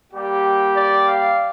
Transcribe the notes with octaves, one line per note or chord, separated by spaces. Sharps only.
G3 A#3 G4
D5
F5